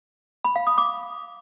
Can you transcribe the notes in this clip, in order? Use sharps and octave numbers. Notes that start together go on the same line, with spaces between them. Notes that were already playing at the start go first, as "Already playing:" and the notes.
B5
F5
D#6
D6